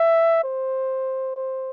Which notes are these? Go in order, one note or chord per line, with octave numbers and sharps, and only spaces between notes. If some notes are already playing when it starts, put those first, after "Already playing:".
Already playing: E5
C5
C5